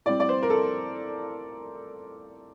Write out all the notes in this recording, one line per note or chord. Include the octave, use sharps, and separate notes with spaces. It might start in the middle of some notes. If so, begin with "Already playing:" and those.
A2 G3 C4 D5
D5
C5
A#4
A4